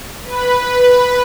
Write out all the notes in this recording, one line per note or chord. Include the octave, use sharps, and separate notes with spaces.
B4